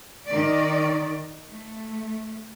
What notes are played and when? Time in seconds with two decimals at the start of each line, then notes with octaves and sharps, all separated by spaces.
0.25 D#3 D5
1.48 A3